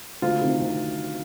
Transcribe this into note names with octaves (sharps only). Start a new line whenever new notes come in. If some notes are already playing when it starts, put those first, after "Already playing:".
D2 F4
C3 D#3
D2